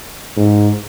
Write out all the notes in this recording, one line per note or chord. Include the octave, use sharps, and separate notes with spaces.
G#2